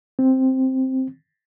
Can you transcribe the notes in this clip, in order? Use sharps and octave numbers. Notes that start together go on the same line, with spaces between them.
C4